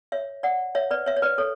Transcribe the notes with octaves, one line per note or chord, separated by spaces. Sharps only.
C#5 E5
D5 F#5
C#5 E5
B4 D5
C#5 E5
C#5
B4 D5
A4 C#5